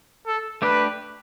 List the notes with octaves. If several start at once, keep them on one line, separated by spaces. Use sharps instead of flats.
A4
A3 D4 G4 B4